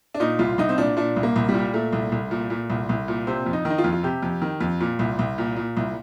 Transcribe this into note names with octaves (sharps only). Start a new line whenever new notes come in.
D4
A#2 D#4
C2 F4
C2 D#4
C4
A#2 D4
A#2 D4
C2
A#3
C2
G3
A#2
A#2 A3
C2
C2
A#2
A#2
C2
C2
A#2
C3 C4
F2
D#4
D#3
D#4
F4
F2
F4
C3 G4
F2
D#3
F2
A#2
C2
C2
A#2
A#2
C2